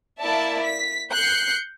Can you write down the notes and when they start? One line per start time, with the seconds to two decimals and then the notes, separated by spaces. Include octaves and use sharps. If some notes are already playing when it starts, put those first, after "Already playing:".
0.20 A#3 E4 D5 E5 A5
0.63 B6
1.13 F#6 G6 C7 C#7